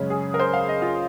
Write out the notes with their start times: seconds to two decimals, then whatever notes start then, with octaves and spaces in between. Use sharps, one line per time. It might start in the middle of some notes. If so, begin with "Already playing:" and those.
Already playing: F#2 C#3 G#3 C#4
0.10 G#4
0.34 A#4
0.40 C5
0.53 F5
0.69 D#5
0.82 F4